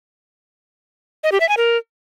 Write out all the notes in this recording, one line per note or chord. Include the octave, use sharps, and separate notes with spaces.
D#5
G4
E5
G#5
A#4